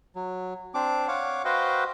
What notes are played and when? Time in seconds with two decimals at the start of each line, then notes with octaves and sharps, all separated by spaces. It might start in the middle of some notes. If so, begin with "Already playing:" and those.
0.16 F#3
0.74 C4 D4 D6
1.08 C#5 F5 F#5 D6
1.45 F#4 B4 C5 D#5 F5 G5